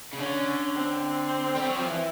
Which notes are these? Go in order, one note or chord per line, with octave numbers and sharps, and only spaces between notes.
C#3
D3 C#4
C4
G3
F#3
F3
E3